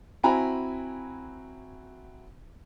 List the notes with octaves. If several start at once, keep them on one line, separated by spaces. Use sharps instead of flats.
C4 E4 F#4 G#5 A#5 B5